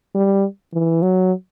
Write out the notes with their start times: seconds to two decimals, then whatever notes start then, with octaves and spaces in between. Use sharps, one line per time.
0.15 G3
0.73 E3
1.02 F#3